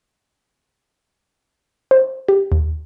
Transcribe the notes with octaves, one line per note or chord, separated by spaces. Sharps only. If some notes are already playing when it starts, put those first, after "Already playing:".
C5
G4
D#2